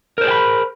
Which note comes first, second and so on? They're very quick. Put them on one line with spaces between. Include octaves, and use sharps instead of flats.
A#4 C5 G#4 G5 B5